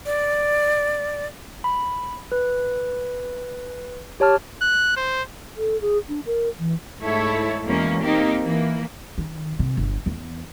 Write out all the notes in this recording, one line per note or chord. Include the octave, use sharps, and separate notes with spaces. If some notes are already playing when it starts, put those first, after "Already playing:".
D5
B5
B4
G4 C#5 A5 F6
F#6
C5
A4
G#4
D4
A#4
E3
G#2 A3 E4 A4 C#5
E2 B2 E3 G#3 A#3 C#4
A#3 C4 D#4 G4
E3 A#3
D#3
C3
G1
E2